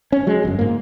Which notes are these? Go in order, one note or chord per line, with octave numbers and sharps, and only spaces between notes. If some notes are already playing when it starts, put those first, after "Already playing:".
C#4
F#3 G#3
G1 F#2
G#2 A#3